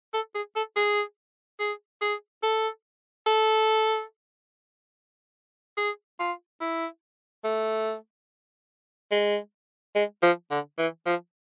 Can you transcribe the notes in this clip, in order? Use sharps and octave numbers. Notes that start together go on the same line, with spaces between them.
A4
G#4
A4
G#4
G#4
G#4
A4
A4
G#4
F4
E4
A3
G#3
G#3
F3
D3
E3
F3